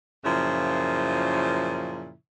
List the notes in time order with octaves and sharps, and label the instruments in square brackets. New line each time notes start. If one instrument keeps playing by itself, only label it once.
[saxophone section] F#2 A#2 C#3 F3 E4